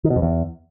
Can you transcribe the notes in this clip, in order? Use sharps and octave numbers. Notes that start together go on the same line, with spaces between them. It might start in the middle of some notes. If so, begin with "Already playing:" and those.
D#3
B2
F2
E2